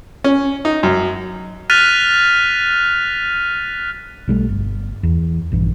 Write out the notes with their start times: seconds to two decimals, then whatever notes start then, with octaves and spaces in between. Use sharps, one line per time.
0.24 C#4
0.65 D#4
0.83 F#2
1.70 F6 F#6 A6 B6 D#7 F7
4.28 B1 G3 A3
4.49 G1
5.03 E2
5.52 A#1 G2 E3